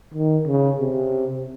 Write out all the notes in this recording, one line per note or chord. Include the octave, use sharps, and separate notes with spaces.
D#3
C#3
C3